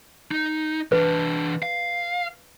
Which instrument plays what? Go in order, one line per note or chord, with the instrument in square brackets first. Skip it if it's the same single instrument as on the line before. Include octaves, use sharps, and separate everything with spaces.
[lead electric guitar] D#4
[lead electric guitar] E3 D4 [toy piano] B4
[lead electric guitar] F5